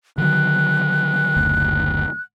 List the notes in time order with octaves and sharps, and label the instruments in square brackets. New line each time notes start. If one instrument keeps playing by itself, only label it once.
[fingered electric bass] D3 D#3 F#3 [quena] F#6
[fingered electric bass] F#1 D2